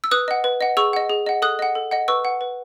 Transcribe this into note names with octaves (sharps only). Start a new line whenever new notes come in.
E6
B4 D#6 F#6
D#5 F#5
B4
D#5 F#5
G#4 C#6 E6
D#5 F#5
G#4
D#5 F#5
A4 D#6 F#6
D#5 F#5
A4
D#5 F#5
B4 C#6 E6
F#5
B4